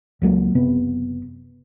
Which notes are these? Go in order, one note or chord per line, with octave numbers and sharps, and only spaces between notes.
C#2 F#3 A3 A#3
F#1 C3 B3